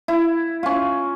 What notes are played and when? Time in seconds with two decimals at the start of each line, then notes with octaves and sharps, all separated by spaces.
0.08 E4
0.63 C#4 F4